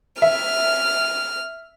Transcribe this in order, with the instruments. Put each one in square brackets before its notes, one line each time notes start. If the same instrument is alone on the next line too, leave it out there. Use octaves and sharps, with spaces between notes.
[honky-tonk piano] E5 [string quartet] F6